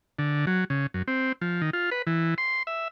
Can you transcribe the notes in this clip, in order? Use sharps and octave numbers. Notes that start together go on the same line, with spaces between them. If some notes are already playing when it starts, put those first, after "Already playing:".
D3
F#3
C#3
F#2
C4
F3
D#3
F4
B4
E3
C6
E5